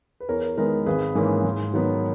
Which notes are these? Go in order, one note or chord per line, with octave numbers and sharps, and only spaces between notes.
B4
E2 A#4 C#5
D#3 G#3 B3 A#4
G#1 G#4 B4
G#2 E3 A#3 C#4
G#2
D#3 F#3 B3